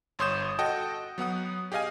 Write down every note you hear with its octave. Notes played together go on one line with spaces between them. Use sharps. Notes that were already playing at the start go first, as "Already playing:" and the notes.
G1 C#5 C6 D#6 G6 E7
F#4 A4 D#5 G5
F#3 B3 F#5 D#6
G4 G#4 D#5 F5 G#5